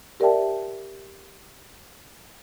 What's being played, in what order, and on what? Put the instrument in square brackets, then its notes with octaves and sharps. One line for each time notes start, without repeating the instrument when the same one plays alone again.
[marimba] G4 A#4 D5 E5 G5 A5